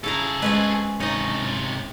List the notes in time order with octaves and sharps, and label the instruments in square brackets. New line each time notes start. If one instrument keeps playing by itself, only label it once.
[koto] C#3 E4 A#5 [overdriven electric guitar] G#4 A4
[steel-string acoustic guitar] G#3 G#5 [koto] C4 C#4 B4
[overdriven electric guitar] C3 C#5 [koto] D#4 D#5